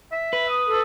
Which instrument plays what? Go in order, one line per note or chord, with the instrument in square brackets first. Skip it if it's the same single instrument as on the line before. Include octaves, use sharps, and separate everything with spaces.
[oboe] E5
[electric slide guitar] B4
[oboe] D#6
[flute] A4